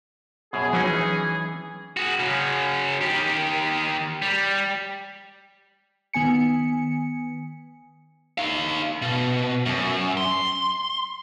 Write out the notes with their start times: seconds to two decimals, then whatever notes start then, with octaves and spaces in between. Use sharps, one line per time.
0.53 F#2 B2 G#4
0.73 E3 F#3 C#4 D#4
1.97 F#4 G#4
2.19 C#3 F#3
3.01 D#3 G4
4.22 G3
6.14 D#3 B3 G#5 C#7
8.38 D#4 F5
9.02 B2
9.66 F#2
10.17 C6